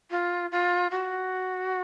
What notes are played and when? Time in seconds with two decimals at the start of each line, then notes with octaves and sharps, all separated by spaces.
0.11 F4
0.52 F4
0.91 F#4